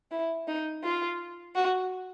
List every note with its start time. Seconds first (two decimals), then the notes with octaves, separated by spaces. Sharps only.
0.11 E4
0.48 D#4
0.83 F4
1.55 F#4